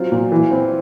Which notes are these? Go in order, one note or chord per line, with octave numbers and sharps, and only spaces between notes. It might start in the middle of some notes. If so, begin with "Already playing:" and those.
Already playing: F#3 C4 F4
A#2
E3
C4